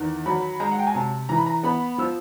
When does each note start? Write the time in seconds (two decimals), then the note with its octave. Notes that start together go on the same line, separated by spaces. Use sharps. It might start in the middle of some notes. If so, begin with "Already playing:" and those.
Already playing: E2 D#3
0.26 F#3 B5
0.60 G#3 A#5
0.72 F#5
0.79 G5
0.87 G#5
0.95 C3 A5
1.29 E3 A#5
1.38 B5
1.46 A#5
1.63 B3 B5
1.98 F3 E6